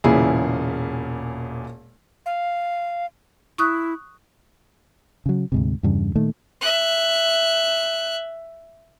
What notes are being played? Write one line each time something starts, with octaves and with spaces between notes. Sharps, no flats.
E1 A#2 C#3 E3 E4 G#4
F5
E4 C#6 D#6 F#6
C#3 F#3
D2 G#2 C3
E2 G2 C#3
A#2 D#3 A3
E5 F#6